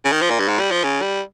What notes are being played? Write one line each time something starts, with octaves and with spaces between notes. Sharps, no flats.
C#3
D#3
F3
A#2
G2
G#2
G3
F3
C#3
G3